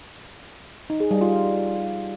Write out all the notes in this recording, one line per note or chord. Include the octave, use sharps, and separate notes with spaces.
D#4
G#4
G3
F4